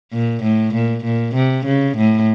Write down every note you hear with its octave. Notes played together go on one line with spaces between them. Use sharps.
A#2
A2
A#2
A#2
C3
C#3
A2